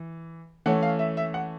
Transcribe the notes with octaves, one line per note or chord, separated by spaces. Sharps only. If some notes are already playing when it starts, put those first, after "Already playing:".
Already playing: E3
E3 A3 C#4 F#5
F5
E5
E5
F#5